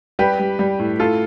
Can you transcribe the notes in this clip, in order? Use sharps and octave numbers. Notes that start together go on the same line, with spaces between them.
G3 G4 B4
G3
G3
A2
A2 F4 A4